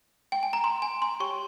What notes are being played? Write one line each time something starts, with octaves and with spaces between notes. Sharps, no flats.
G5
G#5
A#5
C6
G#5
C6
G4 C#5 G5 C#6